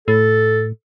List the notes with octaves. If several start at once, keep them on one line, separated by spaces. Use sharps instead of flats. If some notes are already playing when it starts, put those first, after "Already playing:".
A2 A4